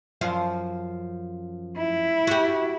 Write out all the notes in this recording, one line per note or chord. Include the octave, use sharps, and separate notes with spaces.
F#2 F3 F5
E4
F#4 G4